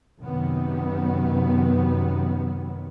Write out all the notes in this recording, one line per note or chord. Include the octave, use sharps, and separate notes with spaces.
F#2 C3 D#3 F#3 B3